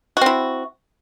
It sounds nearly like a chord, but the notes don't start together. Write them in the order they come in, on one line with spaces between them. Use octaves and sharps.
F#4 C4 E4